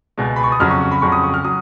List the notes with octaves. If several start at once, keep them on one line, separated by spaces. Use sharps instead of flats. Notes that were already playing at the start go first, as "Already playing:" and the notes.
C#2 B2 G#3
B5
C#6
D#6
F2 C#3 F#3 F6
C#6
C#6
B5
F2 C#3 F#3 C#6
D#6
C#6
F6
F#3 D#6